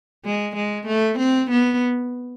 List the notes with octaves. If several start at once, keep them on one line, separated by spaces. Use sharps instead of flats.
G#3
G#3
A3
C4
B3